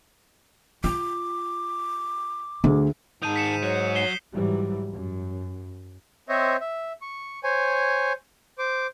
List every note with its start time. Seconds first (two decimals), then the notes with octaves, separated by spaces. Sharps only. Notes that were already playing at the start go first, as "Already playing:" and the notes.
0.84 F4 D6
2.64 D2 D3 G#4
3.22 G#2 D#3 A5 D#6 G6 D#7
3.36 B6 C#7 E7
3.63 F#3 C#5
3.95 C7 E7 G7
4.33 G#2 E3 F#3 G3
4.92 F#2
6.29 C4 C5 C#5 D#5 E5
6.61 E5
7.02 C#6
7.44 C5 C#5 G#5
8.58 C5 D6